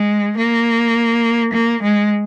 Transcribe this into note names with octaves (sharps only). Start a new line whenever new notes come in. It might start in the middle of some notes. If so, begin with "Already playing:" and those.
Already playing: G#3
A#3
A#3
G#3